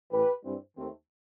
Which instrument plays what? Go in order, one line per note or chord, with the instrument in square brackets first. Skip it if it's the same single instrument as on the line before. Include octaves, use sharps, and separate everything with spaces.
[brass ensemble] A1 A2 E3 G4 B4
G2 E3 G3 C4
D#2 D#3 A3 C4